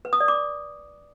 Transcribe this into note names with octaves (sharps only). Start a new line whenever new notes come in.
B4
D#6
D5
D6